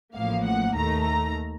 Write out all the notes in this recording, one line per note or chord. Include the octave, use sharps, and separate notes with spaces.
A1 A2 F3 A#3 F5
F#5
D#2 D#3 A3 A#5
A#5